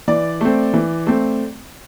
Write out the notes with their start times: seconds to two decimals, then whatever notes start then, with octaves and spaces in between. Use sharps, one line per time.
0.08 E3 D5
0.41 A3 C4
0.74 E3
1.07 A3 C4